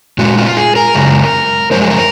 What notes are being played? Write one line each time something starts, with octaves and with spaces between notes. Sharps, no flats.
A#2 G#3 F#4
F4
G#4
A#4
F#2 C#3 G#3
F#2 F3 G#3 C5
G#4
A#4